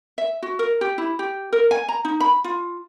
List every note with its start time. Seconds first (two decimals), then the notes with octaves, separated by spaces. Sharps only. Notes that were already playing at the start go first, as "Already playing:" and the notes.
0.18 E5
0.42 F#4
0.59 A#4
0.81 G4
0.98 E4
1.19 G4
1.53 A#4
1.71 G#5
1.89 A#5
2.05 D#4
2.20 B5
2.44 F4